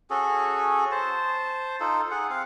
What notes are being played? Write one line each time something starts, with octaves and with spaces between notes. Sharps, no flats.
C#4 F#4 G#4 A4
C5 A5
D#4 F4 A4
G#4 F#5
C4 F5